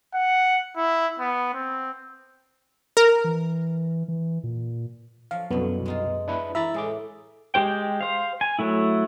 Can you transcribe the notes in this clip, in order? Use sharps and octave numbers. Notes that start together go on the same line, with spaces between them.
F#5
E4
B3
C4
A#4
E3
E3
A#2
F3 F#3 F5
C2 F#2 B2 D3 F#3 B3
G#3 D#4 F4
D4 E4 B4
E3 E4 E5 A#5 B5 A6
A2 G#3 G#4 D6
G#3 G4 C5 G5
C5 F5
G#5
F#3 A3 E4